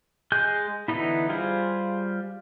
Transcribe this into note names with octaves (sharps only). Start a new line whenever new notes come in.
G#3 G#4 G#5 F#6 G6
D3 E3 B3 D#4 E4
G3 F4 G#4 C5